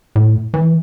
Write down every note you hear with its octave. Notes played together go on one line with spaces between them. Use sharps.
A2
E3